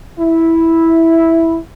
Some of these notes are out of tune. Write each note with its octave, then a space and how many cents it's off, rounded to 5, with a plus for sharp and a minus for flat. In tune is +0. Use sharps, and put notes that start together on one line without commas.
E4 -5